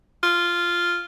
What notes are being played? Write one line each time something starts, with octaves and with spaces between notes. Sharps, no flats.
F4